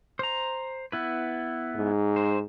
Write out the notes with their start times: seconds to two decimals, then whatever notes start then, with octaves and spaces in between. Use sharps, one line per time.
0.19 C5 A#5
0.92 B3 E4 B4
1.76 G#2
2.16 C5